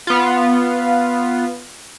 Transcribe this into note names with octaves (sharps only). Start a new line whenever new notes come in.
B3 F4